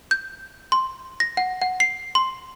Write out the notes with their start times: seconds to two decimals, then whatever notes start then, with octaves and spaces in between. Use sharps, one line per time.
0.11 G6
0.72 C6
1.20 A#6
1.37 F#5
1.62 F#5
1.80 C7
2.15 C6